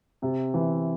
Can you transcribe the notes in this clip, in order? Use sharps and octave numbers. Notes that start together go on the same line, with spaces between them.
C3
E3